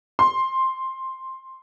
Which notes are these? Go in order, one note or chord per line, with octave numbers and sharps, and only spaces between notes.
C6